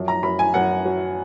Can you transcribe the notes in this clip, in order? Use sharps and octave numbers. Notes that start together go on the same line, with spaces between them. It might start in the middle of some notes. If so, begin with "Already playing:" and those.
Already playing: F#2 F3
A#5
F#2 B5
G#5
F#2 F#5
F#3